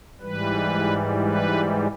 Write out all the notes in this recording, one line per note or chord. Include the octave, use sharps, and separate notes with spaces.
G#2 E3 G3 B4
B4